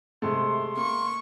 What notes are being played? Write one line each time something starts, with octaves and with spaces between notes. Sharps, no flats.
C3 G#3 A3 C6
A#3 C#6